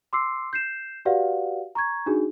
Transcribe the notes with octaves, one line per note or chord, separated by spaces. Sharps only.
C6 D6 E6 C7
G6 C7 E7
F#4 G4 B4 D5 F5 F#5
A#5 C#6 G#6
D4 D#4 F#4 G#4